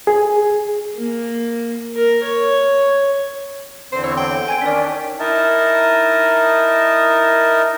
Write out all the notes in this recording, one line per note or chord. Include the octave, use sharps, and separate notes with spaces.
G#4
A#3
A#4
C#5
E2 D3 C4 C5
C#5 E6
G5
G#5 G#6 D7
D#3 C#4 D4 D5 B6
D#4 E4 A#4 A5